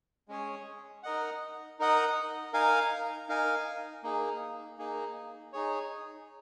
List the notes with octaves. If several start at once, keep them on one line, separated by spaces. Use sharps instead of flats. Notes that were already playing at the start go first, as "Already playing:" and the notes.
G#3 C#4 G#4 C#5
D#4 A#4 D#5 F#5
D#4 A#4 D#5 F#5
D#4 A#4 F5 G#5
D#4 A#4 F5 G#5
A#3 D#4 G#4
A#3 D#4 G#4
D#4 G#4 C#5